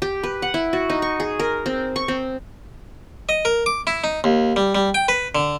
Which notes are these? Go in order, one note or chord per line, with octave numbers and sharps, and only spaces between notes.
G4
B4
F#5
E4
F#4
D#4
C#6
G#4
A#4
C4
C#6
C4
D#5
A#4
D6
E4
D#4
D#2
G3
G3
G5
B4
D3